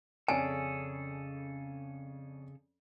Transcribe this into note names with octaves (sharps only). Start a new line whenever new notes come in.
F2 C#3 C#4 G#4 A4 D5 G#5 A5